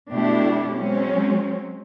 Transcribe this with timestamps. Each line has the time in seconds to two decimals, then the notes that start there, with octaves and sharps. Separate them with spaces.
0.11 B2 A3 D4 E4 G4
0.77 F#3 G#3 C4 C#4